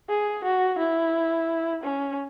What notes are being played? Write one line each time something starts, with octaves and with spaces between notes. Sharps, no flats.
G#4
F#4
E4
C#4